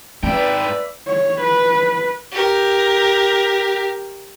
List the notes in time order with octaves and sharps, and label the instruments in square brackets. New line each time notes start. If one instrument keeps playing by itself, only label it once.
[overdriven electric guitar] G#2 G5 [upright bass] C4 [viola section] B4 D5 E5
[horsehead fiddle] C#5
B4
[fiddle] G4 A#4